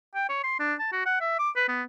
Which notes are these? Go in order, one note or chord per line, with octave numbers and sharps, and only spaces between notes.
G5
C#5
C6
D4
A5
F#4
F#5
E5
D6
B4
B3